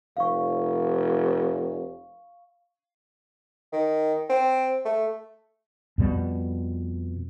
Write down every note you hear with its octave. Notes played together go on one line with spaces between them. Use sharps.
F1 F5 C#6
D#3
C4
A3
F2 B2 G3 B3